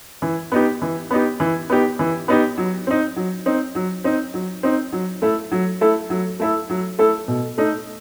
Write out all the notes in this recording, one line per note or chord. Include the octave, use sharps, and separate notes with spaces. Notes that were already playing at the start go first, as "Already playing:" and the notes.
E3
B3 D#4 G4
E3
B3 D#4 G4
E3
B3 D#4 G4
E3
B3 D#4 G4
F#3
C4 D#4
F#3
C4 D#4
F#3
C4 D#4
F#3
C4 D#4
F#3
A3 E4 A4
F#3
A3 E4 A4
F#3
A3 E4 A4
F#3
A3 E4 A4
B2
A3 D#4